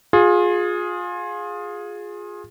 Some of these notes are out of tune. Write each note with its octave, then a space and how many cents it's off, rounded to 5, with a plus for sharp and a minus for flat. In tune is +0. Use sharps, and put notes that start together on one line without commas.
F4 +25 G#4 +0